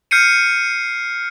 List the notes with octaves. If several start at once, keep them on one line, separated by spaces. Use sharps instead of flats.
F6 G6 C7 C#7 D#7